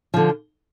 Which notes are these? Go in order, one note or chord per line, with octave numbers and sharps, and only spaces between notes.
D3 F3